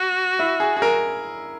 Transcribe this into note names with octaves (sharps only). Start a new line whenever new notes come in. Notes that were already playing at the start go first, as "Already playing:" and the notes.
Already playing: F#4
E4
G#4
G#4
A#4